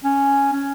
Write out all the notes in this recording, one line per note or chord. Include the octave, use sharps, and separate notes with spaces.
C#4
C#4